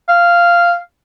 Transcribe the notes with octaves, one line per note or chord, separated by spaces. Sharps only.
F5